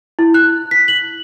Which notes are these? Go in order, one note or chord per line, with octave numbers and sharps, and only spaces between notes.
E4
F#6
B6
F#7